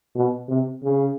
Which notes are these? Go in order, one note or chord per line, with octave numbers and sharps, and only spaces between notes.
B2
C3
C#3